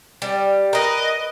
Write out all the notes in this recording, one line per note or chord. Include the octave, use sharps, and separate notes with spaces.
G3
A#4 B4 D#5